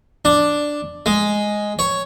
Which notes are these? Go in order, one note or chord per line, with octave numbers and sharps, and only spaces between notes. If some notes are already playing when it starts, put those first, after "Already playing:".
D4
G#3
C#5